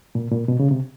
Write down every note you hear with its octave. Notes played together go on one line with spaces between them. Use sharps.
A#2
A#2
B2
C#3
C3